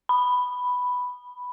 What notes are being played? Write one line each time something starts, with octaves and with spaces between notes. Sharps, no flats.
B5